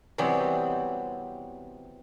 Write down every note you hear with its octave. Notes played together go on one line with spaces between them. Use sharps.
C3 E3 F#3 G3 B3 C4